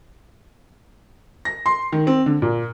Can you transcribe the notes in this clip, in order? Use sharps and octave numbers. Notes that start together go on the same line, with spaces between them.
A#6
C6
D#3
C4
D3
A#2